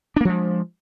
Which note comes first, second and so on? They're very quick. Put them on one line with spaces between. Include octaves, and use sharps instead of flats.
D4 A#3 F3 G#3